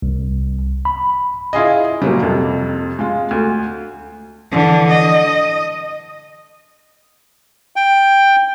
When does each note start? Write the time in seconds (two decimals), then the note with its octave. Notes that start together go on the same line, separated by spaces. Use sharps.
0.02 C2
0.85 B5
1.53 E4 F4 G#4 D#5
2.02 A#2 F#3 G3
2.22 F2 C3
2.99 G#3 F4
3.31 D2
4.51 D3 E3
4.90 D#5
7.76 G5